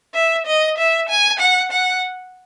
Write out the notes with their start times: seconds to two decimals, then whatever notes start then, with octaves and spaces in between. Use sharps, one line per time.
0.14 E5
0.47 D#5
0.78 E5
1.09 G#5
1.39 F#5
1.71 F#5